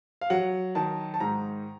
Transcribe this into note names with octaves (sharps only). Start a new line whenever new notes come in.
F5
F#3 F#5
D#3 A5
A5
G#2 A#5